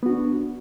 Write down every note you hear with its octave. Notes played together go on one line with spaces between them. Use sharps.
B3 D4 F#4